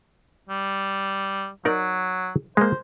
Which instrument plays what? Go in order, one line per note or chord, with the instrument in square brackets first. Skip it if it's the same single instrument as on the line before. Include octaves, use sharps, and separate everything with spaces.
[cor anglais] G3
[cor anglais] F#3 [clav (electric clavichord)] D#4 A#4 D5
[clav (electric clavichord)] G#3 A#3 [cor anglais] C5